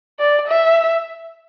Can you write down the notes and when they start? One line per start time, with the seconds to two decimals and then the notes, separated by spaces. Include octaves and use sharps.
0.19 D5
0.47 E5